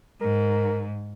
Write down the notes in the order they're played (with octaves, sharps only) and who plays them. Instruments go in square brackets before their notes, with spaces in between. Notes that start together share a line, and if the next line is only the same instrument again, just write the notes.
[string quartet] G#2 [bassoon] A#4